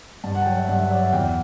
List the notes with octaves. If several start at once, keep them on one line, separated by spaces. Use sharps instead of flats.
G2 A5
F#5
A5
F#3 G5
E5
G2 F#5
E5
F#3 D5
E5
F#5
E2 G5